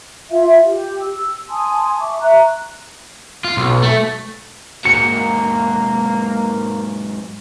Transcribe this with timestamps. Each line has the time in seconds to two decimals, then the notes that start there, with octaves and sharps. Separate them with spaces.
0.31 F4 E5 F5
0.63 G4
1.01 E6
1.49 G#5 A5 C6 D#6
1.99 E5 C#6 D6
2.20 E5 A#5 F#6
3.44 F4
3.57 B1
3.83 A3
4.85 G#2 F#3 A#3 C#7